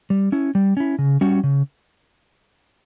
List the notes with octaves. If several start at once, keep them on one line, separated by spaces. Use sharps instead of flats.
G3
C#4 E4
G3
C#4 E4
C#3
G3 C#4 F#4
C#3